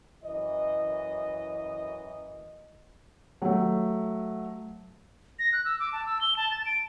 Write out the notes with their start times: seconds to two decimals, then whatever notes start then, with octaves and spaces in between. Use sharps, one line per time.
0.25 F#2 E3 D#5
3.42 F#3 A3
5.39 A#6
5.53 F#6
5.65 E6
5.80 D6
5.93 A5
6.06 E6
6.21 G7
6.37 A5
6.51 A6
6.65 D7